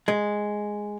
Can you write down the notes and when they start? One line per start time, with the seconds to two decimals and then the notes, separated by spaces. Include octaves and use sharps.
0.08 G#3